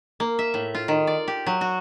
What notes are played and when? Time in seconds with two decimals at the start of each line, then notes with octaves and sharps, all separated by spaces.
0.20 A#3
0.39 E5
0.54 A2
0.75 F4
0.88 D#3
1.07 D5
1.28 G4
1.46 F#3
1.61 F#4